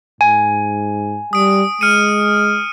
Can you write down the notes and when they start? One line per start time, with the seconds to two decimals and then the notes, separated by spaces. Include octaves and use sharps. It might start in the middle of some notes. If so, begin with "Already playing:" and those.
0.21 G#2 G#5
1.33 G3 D#6 D7
1.81 G#3 F6 C#7 D#7